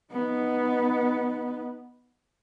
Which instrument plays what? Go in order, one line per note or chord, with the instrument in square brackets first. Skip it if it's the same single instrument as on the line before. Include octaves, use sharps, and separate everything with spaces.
[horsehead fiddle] B3 D#4